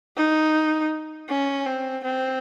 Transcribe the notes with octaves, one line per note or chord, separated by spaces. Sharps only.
D#4
C#4
C4
C4